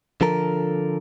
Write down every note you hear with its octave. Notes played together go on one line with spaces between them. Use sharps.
D3 F3 A4 A#4